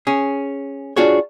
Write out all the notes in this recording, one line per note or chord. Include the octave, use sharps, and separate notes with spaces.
C#4 G#4
D4 F4 F#4 G#4 C#5